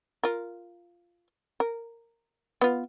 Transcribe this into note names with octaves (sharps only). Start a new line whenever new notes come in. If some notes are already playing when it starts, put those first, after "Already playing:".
F4 A#4
A#4
B3 F4